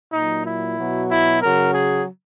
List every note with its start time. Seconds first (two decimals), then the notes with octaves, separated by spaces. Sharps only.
0.12 A#2 F#3 D#4
0.45 E4
0.77 B2 F#3
1.10 E4
1.42 C#3 F#3 A#4
1.74 G#4